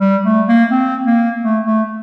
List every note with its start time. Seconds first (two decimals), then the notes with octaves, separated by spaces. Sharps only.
0.01 G3
0.25 A3
0.48 A#3
0.71 C4
1.06 A#3
1.43 A3
1.66 A3